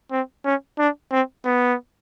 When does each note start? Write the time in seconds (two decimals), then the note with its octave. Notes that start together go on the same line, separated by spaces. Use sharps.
0.11 C4
0.45 C#4
0.79 D4
1.11 C4
1.45 B3